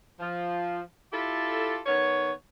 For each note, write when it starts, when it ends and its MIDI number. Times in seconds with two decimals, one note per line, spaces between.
0.20 0.80 53
1.13 1.80 64
1.13 1.80 65
1.13 1.80 67
1.13 1.80 69
1.86 2.32 51
1.86 2.32 59
1.86 2.32 73